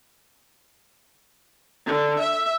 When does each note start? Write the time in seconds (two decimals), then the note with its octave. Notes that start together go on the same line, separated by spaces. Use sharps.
1.86 D3
2.20 E5